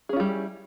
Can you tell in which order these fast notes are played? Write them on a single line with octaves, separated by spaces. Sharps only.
G#4 C#4 F4 G3 E4